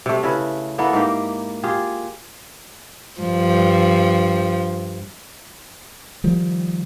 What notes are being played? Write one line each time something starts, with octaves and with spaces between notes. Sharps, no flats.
C3 A3
C#3 E4 B4
A#3 B3 E4 A4
G#2 A#3 G4 G5
F4 G4 G#4
G2 F3
D#3 F3 G3